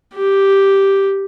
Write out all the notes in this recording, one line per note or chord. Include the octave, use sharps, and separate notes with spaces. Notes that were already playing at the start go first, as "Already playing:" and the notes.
G4